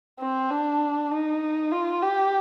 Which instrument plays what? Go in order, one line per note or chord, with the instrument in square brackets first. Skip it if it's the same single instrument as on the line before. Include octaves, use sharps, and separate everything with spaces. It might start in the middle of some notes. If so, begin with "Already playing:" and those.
[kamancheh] C4
D4
D#4
F4
G4